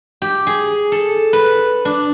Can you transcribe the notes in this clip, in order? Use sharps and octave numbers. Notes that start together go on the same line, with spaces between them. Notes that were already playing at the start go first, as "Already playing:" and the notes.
G4
G#4
A4
B4
D4